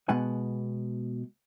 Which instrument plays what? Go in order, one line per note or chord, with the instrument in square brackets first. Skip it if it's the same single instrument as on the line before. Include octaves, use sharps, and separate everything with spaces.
[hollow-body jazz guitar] B2 G#3 F#5 G#5